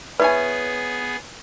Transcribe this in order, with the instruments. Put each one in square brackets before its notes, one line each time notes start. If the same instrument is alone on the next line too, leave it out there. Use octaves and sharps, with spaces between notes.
[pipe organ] B3 G#4 [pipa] E4 C#5 G#5 [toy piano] B4